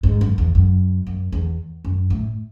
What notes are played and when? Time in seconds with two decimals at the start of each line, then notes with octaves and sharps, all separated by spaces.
0.03 G#2
0.21 F#2
0.38 E2
0.55 F#2
1.07 F#2
1.32 E2
1.85 F#2
2.10 A2